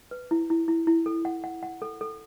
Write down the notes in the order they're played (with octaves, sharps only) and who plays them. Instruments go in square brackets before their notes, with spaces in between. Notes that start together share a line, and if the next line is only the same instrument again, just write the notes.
[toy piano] B4
E4
E4
E4
E4
A4
F#5
F#5
F#5
A4
A4